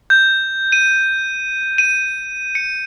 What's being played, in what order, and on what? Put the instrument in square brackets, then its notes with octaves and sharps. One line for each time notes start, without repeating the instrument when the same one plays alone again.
[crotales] G6
D#7
D#7
C#7